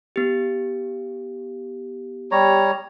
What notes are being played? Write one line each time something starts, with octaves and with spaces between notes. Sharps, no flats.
B3 G4
G3 C#5 A#5